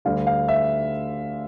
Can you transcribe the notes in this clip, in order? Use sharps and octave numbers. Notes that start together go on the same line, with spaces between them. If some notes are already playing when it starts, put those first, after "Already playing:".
D2 D3 G3 F5
F5
E5